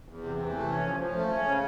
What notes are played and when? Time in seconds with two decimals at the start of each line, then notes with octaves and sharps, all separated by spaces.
0.09 E2
0.24 C3
0.39 E3
0.54 A3
0.70 C#4
0.85 F3
1.00 F3
1.15 A3
1.31 C#4
1.46 C#3